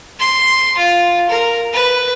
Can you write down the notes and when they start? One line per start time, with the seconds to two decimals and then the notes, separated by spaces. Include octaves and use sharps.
0.19 C6
0.78 F4
1.30 A#4
1.73 B4